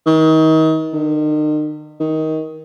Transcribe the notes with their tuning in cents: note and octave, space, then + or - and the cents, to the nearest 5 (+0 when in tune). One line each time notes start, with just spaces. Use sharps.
D#3 +35
D#3 -40
D#3 +15